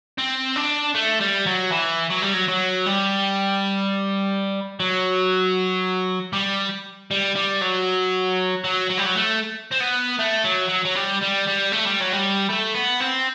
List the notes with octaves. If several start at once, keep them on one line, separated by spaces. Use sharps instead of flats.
C4
D4
A3
G3
F#3
E3
F#3
G3
F#3
F#3
G3
F#3
G3
G3
G3
F#3
F#3
F#3
G3
F#3
A3
C4
B3
A3
F#3
F#3
F#3
G3
G3
G3
A3
G3
F#3
G3
A3
B3
C4